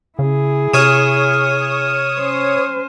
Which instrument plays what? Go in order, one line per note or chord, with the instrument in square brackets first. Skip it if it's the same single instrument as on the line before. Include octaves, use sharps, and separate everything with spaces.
[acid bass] C#3 [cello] E4 G#4
[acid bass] C3 [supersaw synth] C#5 D#6 [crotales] F6 D#7 E7
[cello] C#4 C5